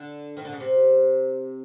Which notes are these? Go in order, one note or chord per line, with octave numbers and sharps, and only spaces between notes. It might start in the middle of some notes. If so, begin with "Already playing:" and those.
Already playing: D3
D#3
D3
C#3
C3